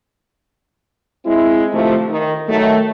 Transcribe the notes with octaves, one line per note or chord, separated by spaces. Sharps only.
G#3 C4 E4
C3 D#3 F3 A3
D#3
D#3 F#3 A3